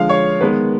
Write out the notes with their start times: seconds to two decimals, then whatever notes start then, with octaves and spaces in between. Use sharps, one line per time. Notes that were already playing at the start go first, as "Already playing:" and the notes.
Already playing: D3 F3 G#3 F5
0.09 C#5
0.40 D#3 G#3 B3 B4